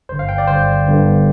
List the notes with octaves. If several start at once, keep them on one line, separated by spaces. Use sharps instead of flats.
G1 G2 D3 C5
F5
G5
D5
G1 G2 D3 C5
G1 G2 D3